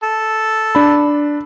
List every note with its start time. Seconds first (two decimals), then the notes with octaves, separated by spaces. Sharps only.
0.03 A4
0.75 D4 B5